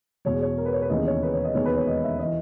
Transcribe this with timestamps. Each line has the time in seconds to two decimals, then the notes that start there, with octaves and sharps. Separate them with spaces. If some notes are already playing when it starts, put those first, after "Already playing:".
0.25 E2 B2 G#3 C#5
0.42 C#5
0.58 A#4
0.66 B4
0.73 C#5
0.82 B4
0.90 D#2 C#3 E3 G#3 B3 D#5
1.06 C#5
1.23 B4
1.33 C#5
1.44 D#5
1.54 E1 D#2 D#3 G#3 B3 C#5
1.65 B4
1.76 C#5
1.87 D#5
2.04 E5
2.19 D#5
2.24 E3